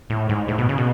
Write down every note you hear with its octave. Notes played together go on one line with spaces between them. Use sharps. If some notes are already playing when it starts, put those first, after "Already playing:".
A2
G#2
A2
B2
C#3
B2